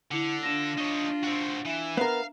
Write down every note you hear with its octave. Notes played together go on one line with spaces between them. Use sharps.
D3 E4 C#7 F7
D4 F4 A#6 E7
D#4 C#5
C4 F#4
E3 E5 E7
B3 A#4 F5